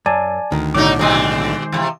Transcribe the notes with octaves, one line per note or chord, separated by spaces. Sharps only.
F#2 D5 G#5 A5
D2 D#3
B1 A2 D3 F#3 D#4 D6
B2 D#3 G#3 C4 D#5
E2 C3